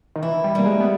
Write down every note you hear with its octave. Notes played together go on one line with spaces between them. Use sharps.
D#3
E3 E4
G3
G3 A#3
G#3
B3